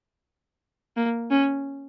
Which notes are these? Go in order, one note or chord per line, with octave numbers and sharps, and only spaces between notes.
A#3
C#4